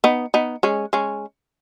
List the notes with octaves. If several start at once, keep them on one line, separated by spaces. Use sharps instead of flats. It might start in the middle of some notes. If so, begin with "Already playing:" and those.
B3 D#4
B3 D#4
G#3 C#4
G#3 C#4